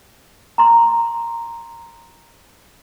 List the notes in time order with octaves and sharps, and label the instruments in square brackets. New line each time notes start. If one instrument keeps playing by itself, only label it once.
[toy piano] A#5 C6